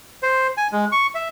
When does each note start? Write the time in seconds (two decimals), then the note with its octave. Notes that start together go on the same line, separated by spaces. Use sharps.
0.23 C5
0.57 G#5
0.72 G#3
0.92 C#6
1.15 E5